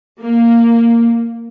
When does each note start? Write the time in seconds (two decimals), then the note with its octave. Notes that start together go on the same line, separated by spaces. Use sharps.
0.21 A#3